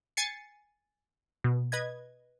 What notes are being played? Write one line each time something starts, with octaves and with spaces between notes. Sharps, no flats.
G#5 A6 C7 C#7
B2
B4 D#5 G#6